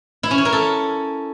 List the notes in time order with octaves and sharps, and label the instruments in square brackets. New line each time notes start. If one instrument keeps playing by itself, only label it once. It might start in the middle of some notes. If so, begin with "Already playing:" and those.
[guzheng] E4
C#4
C#5
A#4
A4